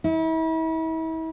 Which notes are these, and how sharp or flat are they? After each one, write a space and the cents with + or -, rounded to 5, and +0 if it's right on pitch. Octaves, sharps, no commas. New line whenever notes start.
E4 -40